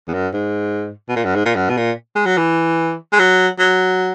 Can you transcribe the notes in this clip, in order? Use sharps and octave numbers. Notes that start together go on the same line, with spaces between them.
E2
F#2
G#2
B2
A#2
F#2
G#2
A#2
F#2
B2
A#2
G#3
F#3
E3
G#3
F#3
F#3